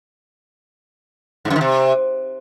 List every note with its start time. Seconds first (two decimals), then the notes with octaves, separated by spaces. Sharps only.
1.45 G#2
1.50 F#2
1.56 D#3
1.61 C3